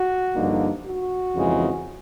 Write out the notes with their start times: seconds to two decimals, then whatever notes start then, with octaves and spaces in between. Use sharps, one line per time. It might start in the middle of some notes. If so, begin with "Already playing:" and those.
Already playing: F#4
0.35 G2 D3 F3 A#3 D#4
0.85 F#4
1.34 F2 C#3 E3 G#3